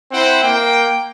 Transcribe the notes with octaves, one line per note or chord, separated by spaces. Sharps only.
C4 E4 C5 F#5 G5
A#3 G5